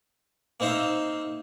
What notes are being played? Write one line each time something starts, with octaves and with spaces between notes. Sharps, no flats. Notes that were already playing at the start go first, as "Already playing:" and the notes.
A#3 C4 D#4 C5 E5 F5